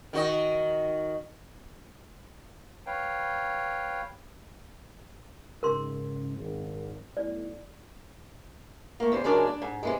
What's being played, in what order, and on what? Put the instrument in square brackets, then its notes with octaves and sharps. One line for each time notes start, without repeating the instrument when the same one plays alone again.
[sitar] D#3 F#4 D#5
[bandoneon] B4 C#5 F5 G5
[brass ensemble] G#2 C#3 [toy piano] A#4 C6
[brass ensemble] G#1
[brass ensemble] B1 A2 [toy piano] D5
[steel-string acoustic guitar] A3 A#3
E2 C3 C5
C#3 F#3 G#3 D4 A#4 D5
D4
G#2
C3 E3 G#3